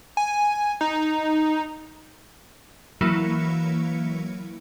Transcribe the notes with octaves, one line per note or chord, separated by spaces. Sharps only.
G#5
D#4
E3 F#3 A#3 E4 C#7